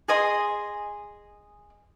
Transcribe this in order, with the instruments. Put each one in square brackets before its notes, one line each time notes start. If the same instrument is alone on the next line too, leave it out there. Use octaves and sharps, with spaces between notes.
[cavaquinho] G#4 D#5 G#5 C6